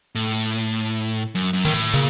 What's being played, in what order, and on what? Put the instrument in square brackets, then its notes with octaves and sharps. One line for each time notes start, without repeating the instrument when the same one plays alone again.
[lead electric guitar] A2
F#2
F#2
[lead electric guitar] A2 [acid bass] D#3
[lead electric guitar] A#2 [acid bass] C#3